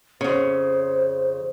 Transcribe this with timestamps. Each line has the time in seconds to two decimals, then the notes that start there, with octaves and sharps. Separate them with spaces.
0.21 F2 C#3 C5